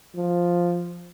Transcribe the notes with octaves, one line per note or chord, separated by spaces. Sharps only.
F3